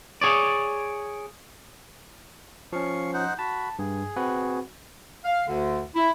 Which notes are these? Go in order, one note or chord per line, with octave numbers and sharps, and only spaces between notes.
G#4 C#5 D5
F3 C#4 F5 C#6
D#4 C5 F#5
F#4 A5 B5
G2 G#4
C4 F#4 B4
F5
D2 D3
E4